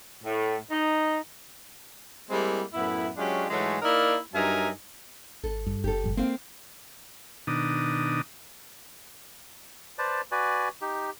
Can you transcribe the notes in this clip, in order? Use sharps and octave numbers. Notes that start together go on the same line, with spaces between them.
A2
D#4
G3 G#3 A#3 C4 E4
F#2 A2 B3 E4
F#3 G#3 C#4 D4 F4 G4
G#2 E3 F#3 G#3 A3
A#3 D#4 E4 A#4 D5
G2 F#3 D#4 A#4 E5 G#5
G#1 A4
G2
F#1 G4 A4
A#1 G2
A#3 C4 F5
B2 D#3 D4 D#6
B4 C5 D5 A5
F#4 B4 D5 G#5
D#4 G4